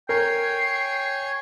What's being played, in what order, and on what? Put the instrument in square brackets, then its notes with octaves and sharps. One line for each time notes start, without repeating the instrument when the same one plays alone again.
[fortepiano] A#4 [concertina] C#5 G#5 [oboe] G5 [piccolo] C7